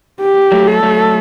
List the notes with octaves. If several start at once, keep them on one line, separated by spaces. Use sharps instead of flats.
G4
F#3 A3
A4
F#3 A3